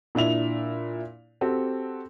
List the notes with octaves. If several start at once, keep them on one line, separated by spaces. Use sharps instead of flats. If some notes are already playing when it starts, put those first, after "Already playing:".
A#2 D4 E4 F7
C4 F#4 G4 A4